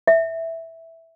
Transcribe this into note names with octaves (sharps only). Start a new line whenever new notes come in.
E5